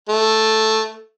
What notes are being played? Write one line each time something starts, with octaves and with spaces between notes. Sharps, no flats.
A3